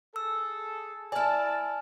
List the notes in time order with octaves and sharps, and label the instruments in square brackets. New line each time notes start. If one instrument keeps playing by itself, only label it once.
[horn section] G#4 A4 [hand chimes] E6
[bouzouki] E4 D5 [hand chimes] G#5 F6 [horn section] A5